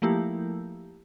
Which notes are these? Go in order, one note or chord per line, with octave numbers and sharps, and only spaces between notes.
F3 A3 A#3 E4 G4